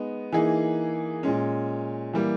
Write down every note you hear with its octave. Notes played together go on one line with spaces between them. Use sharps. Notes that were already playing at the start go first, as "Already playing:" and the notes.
Already playing: G#3 B3 D#4
E3 A#3 D#4 G#4
A#2 G#3 C#4
E3 G3 A#3